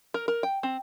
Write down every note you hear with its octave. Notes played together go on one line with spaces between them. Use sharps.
A#4
A#4
G5
C4